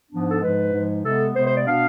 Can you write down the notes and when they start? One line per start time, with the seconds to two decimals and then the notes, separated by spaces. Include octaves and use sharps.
0.10 G#2 F3 B3 D4
0.31 A4
0.41 G#2 F3 G#3 B4
0.72 G#2 F3 G#3
1.03 C3 G#3 B3 A4
1.35 C3 G#3 B3 C5
1.45 C5
1.55 D5
1.65 B2 B3 D4 F5